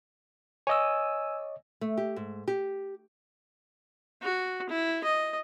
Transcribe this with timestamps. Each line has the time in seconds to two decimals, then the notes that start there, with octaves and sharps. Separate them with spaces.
0.67 C#5 D#5 G#5 E6
1.81 A3
1.97 G4
2.16 G#2
2.48 G4
4.22 F#4
4.69 E4
5.04 D#5